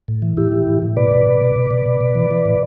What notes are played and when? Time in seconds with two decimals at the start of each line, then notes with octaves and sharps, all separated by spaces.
0.08 A2
0.22 E3
0.37 A2 E4 G4
0.52 E3
0.67 A2
0.82 A2
0.97 B2 B4 D5
1.11 B2
1.27 B2
1.41 B2
1.56 B2
1.71 B2
1.86 B2
2.01 B2
2.15 E3
2.31 E3
2.46 A2